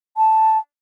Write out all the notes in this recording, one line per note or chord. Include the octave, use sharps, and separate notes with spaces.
A5